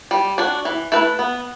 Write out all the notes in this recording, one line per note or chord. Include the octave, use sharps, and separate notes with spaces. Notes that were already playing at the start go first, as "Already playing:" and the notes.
G3
D4 F#4
E3
A3 E4 B4
B3